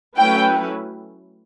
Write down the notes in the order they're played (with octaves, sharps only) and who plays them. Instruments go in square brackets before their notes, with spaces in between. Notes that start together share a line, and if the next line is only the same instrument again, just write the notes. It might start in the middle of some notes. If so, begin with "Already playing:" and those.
[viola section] F#3 A3 C#4 E4 B4 [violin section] G5